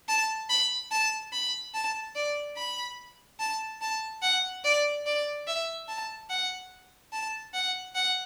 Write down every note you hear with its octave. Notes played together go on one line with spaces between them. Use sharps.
A5
B5
A5
B5
A5
D5
B5
A5
A5
F#5
D5
D5
E5
A5
F#5
A5
F#5
F#5